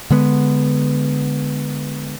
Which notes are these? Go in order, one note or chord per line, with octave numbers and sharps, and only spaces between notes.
D3 G#3 B3